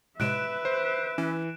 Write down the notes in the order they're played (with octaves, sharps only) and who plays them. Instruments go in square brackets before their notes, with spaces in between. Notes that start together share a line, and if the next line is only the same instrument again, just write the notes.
[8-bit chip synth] A2 C3 G#3 [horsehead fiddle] B4 E5 [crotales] F#6 D7 E7
[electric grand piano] C5
[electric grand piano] E3 [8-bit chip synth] C#4